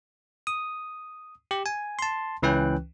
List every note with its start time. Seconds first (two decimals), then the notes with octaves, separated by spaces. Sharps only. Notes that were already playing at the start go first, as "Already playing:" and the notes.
0.47 D#6
1.51 G4
1.66 G#5
1.99 A5 C6
2.42 C#2 E3 C#4 B4 G5 F#6